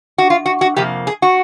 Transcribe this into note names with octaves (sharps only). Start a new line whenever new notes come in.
F#4
F4
F#4
F#4
F2 C3 F3 A#3 G4
G#4
F#4